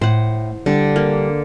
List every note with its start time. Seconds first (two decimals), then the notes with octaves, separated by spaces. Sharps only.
0.01 A2 C5 F#5
0.66 D3 G3 D4
0.96 A#3